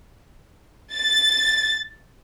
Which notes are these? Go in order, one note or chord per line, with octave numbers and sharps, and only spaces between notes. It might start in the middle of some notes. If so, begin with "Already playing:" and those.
A6